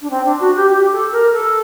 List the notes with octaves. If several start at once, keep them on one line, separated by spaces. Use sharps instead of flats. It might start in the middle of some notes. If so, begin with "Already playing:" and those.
D4
C4
D4
F#4
G4
G4
A4
A#4
A4